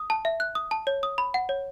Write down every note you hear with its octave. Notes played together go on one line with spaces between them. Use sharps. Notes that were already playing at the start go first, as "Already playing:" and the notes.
Already playing: D#6
A5
E5
F#6
D#6
A5
C#5
D#6
B5
F#5
C#5